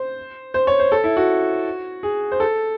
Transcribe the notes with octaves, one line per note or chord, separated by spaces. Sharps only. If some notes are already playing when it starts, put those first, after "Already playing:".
Already playing: C5
C5
C#5
C5
A4
E4
F#4
G#4
C5
A4